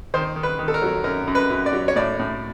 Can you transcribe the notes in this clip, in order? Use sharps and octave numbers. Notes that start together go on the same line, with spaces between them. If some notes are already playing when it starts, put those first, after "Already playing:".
D#3 C5
D#3
B4
D#3
A4
A#4
F#3
F#2 A#4
F#2
B4
F#2
D5
F#3
C#5
A2 D5
A2